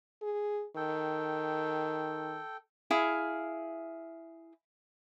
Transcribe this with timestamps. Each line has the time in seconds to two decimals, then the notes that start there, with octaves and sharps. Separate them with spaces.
0.22 G#4
0.76 D#3 A4 G5
2.91 E4 G#4 F5